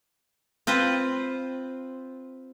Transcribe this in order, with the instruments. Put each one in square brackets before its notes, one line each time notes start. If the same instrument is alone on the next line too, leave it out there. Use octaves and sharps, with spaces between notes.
[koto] C4 F4 B4 C5